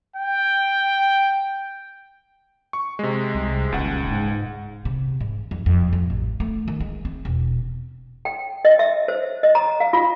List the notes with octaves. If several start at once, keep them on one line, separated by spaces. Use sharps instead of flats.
G5
C#6
C3 G#3
C2
D#1 C#2 F#5
G#2
C3
G#2
F2
F2
F2
A1
A3
D#3
G#3
C4
E1
G5
D#5
E5
C5
D#5
A#5
F5
F4